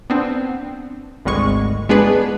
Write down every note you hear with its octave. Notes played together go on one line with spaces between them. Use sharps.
B3 C4 D4
G#1 D2 G3 G#3 C#6
G#3 B3 D4 G#4 B4